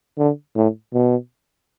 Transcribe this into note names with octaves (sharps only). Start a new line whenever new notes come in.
D3
A2
B2